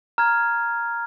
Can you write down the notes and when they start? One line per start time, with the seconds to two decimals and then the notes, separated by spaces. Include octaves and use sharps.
0.18 A#5 F6 G#6